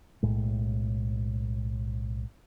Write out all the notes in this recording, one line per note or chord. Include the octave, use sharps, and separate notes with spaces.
B1 A2 G#3